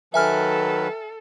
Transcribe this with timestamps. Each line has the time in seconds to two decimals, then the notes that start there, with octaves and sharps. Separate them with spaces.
0.14 D#3 F#3 A4 B4 E5 G#5 F6